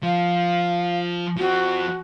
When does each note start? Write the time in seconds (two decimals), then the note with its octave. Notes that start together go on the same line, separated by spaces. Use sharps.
0.03 F3 F5
1.38 F3 C4 F#4